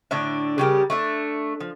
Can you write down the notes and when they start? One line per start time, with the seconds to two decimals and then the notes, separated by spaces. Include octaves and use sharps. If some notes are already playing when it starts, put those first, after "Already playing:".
0.11 A2 D3 D4 E5
0.58 C#3 G3 G4 A#4
0.90 A3 D4 E5
1.61 F3